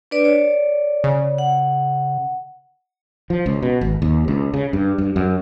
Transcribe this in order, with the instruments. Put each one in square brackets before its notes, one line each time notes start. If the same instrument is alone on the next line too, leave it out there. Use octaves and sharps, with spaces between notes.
[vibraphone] D4 B4 D5
C#5 D5
[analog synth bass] C#3
[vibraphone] F#5
[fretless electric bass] F3
C#2
B2
G#1
D#2
C#2
C#3
G2
G2
F#2